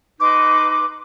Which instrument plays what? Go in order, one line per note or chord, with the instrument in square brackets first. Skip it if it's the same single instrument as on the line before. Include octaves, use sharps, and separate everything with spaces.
[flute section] D#4 B4 C6 D6